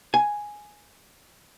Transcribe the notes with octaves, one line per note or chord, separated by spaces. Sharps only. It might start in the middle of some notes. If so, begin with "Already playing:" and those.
G#5